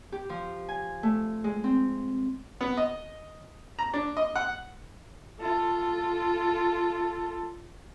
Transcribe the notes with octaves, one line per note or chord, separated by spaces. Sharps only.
G4
F3
G#5
A3
G#3
C4
B3
D#5
A#5
D4
D#5
F#5
F4 A4